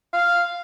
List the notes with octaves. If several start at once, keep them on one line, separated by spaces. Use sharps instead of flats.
F5